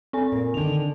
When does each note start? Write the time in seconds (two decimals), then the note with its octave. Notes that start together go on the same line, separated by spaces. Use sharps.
0.13 C4 A4 G#5
0.32 A#2
0.54 D3 D#3 F7